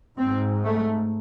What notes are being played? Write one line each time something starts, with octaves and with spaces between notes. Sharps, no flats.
G#2 C4
A3